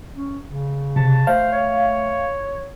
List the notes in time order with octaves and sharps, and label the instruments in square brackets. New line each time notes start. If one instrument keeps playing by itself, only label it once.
[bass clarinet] C#4
C#3
[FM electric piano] C3 [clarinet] A5
[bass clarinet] A3 [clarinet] C5 [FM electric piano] F5
[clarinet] C#5